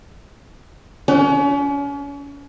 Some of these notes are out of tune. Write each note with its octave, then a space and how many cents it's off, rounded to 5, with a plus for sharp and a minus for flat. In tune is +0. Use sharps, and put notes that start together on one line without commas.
C#4 +35 C#5 +45